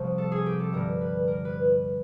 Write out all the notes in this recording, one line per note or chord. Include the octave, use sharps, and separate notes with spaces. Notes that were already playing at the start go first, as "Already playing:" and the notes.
Already playing: C2 C3 F3
A4
G#4
G4
A4
G2 D3 G3 A#4
B4
A#4
B4